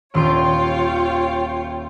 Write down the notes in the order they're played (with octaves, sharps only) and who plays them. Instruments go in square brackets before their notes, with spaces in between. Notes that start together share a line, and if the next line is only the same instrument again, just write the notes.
[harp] D#1 C6 D7 [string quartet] F4 C#5 G5